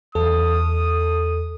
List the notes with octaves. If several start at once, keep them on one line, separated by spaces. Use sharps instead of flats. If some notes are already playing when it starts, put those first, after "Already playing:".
E2 A4 D#6